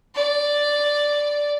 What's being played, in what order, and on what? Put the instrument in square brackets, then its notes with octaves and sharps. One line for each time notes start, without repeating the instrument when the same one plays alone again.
[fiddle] D5